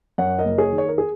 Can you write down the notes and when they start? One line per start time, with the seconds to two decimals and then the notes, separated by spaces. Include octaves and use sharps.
0.18 F#2 C#5 F#5
0.39 A#4 D#5
0.45 F#1
0.58 G#4 C#5
0.72 D#3
0.78 C#5
0.89 A#4
0.98 G#4